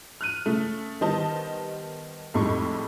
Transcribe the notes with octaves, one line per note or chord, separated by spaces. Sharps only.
F6 F#6 D#7
C#3 A3
D#3 G3 B3 C5 D#5 A5
F2 A2 G3 G#3 D#4 C#6